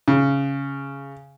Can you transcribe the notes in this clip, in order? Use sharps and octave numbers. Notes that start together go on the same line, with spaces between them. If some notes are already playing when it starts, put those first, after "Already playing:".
C#3